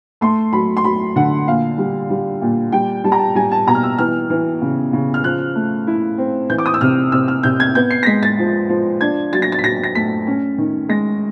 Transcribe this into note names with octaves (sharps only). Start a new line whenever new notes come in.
A3 C6
F#3 B5
C6
F#3 B5
D3 F#5
A#2 F5
G3
G3
A#2
G3 G5
G3 A5
A#5
A5
G3 G#5
A5
B2 A#5
F6
E6
E3 F6
E3
C#3
C#3
F6
F3 F#6
A3
E4
C4
E3 G6
D6
D#6
E6
C3 F6
C3 E6
F6
C3 G6
G#6
B3 G6
C7
A#6
G#3 B6
A6
F3
F3
D4 G#6
F#3 A6
A#6
A6
B6
F#3 A#6
A#6
A3 B6
C#4
D#3
G#3 A#6